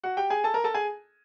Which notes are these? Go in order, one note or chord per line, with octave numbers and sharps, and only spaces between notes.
F#4 F#5
G4 G5
G#4 G#5
A4 A5
A#4 A#5
A4 A5
G#4 G#5